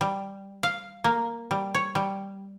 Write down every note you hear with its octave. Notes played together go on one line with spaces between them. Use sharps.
G3
F5
A#3
G3
C#5
G3